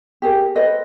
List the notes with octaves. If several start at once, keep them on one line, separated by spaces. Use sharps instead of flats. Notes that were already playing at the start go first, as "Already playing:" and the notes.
G4 G#4 A#4
A4 B4 C5 D#5